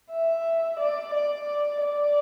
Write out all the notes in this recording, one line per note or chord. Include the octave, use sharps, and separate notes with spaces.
E5
D5
D5
D5